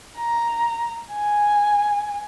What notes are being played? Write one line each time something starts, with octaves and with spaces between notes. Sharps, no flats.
A#5
G#5